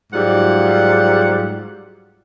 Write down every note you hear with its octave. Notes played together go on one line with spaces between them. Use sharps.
G#2 F#3 G3 F4 F#5